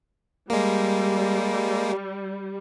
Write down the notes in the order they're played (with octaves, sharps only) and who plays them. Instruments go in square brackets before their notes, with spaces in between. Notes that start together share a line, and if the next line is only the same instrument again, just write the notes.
[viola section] G3 [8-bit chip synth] G#3 A#3